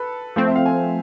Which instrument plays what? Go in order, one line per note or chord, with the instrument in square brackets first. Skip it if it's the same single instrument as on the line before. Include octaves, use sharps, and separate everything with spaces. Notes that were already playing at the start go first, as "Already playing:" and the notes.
Already playing: [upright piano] A4 B4
[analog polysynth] F3 A3 C4 [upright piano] C5
[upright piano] E5
F5
G#5